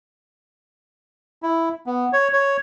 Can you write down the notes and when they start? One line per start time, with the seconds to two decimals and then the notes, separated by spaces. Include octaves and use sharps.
1.43 E4
1.86 B3
2.13 C#5
2.33 C#5